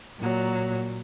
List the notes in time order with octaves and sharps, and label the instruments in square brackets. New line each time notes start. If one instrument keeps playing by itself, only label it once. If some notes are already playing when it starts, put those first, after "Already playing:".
[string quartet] A#2 F#3